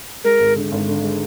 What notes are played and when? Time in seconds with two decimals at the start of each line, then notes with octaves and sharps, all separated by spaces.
0.24 G#3 A#4
0.40 G#1
0.56 D3
0.72 G#1
0.87 D3
1.03 G#3